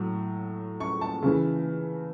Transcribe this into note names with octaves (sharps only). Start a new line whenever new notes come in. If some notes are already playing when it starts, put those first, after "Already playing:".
Already playing: A2 F#3
C#6
A5
C#3 E3